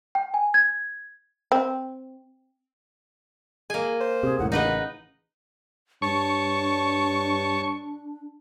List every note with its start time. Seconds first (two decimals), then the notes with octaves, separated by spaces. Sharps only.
0.15 G5
0.34 G#5
0.54 G#6
1.52 C4
3.70 A#3 G#4 G#5
4.00 C5
4.23 C3 G#4
4.39 E1 C#2 A2 F#5
4.52 A1 C#3 A#3 D#4 B4 D#5 F#5
6.02 G2 D4 C#5 A5 C#6